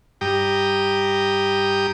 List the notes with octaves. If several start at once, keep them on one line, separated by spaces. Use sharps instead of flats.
G2 G4 G5 A#5 D#6